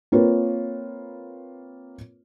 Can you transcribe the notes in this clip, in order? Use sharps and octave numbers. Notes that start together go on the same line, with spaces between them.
A#3 C4 F4 A#4 B4 C#5